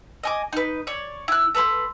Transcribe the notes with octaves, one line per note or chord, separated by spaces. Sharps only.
D#5 G#5 D6
D#4 B4
C#5 D5
E4 F#6
A4 B4 B5 C6